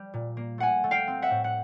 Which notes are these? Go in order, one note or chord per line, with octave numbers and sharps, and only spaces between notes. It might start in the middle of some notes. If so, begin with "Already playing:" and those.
Already playing: G3
A#2
A#3
A3 F#5 G#5
A3
F5 G5
C4
E5 F#5
A2
F#5